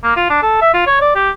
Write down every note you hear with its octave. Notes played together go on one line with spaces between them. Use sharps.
A#3
F4
D4
A4
E5
F4
C#5
D5
G4